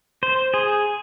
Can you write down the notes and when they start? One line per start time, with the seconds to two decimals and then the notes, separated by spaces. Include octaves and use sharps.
0.23 C5
0.54 G#4